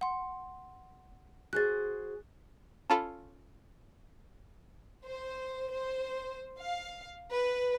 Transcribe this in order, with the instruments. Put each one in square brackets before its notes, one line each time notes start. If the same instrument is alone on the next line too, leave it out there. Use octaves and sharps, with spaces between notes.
[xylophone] F#5 C6
[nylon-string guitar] F#4 G#4 C5 [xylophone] F#6 A6
[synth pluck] C#4 F4 A4 [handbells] A5 B5
[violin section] C5
C5
F5
B4